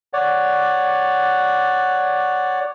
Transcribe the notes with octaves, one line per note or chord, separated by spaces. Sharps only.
C#5 D5 F#5